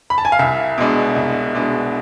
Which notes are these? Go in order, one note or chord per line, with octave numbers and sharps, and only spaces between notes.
B5
A5
G#5
F5
C2 E5
B2 G#3 D4
C2
B2 G#3 D4